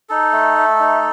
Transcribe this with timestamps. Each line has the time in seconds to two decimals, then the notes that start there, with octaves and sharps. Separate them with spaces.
0.09 D#4 A4
0.33 A3
0.57 A3
0.80 D#4